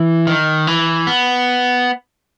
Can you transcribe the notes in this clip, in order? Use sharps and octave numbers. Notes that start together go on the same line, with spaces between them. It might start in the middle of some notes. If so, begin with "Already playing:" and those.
Already playing: E3
D#3
E3
B3